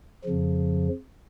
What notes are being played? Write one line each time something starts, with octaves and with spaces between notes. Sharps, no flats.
F2 C#3 F3